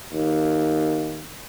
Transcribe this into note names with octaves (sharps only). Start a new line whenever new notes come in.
D#2